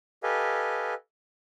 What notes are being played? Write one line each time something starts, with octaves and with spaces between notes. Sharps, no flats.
G4 A4 B4 D#5 F5 G#5